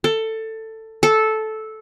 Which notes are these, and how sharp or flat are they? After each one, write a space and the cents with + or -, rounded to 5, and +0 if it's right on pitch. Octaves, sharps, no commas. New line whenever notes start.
A4 +15
A4 -10